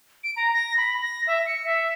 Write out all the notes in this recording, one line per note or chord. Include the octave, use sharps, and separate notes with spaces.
D7
A#5
A#6
B5
A#6
E5
C#7
E5